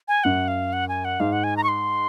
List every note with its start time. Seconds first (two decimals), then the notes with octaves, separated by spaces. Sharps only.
0.08 G#5
0.24 F#2 F#5
0.48 F5
0.73 F#5
0.89 G#5
1.05 F#5
1.20 G#2 F5
1.33 F#5
1.44 G#5
1.57 A#5
1.64 C#6
1.68 C6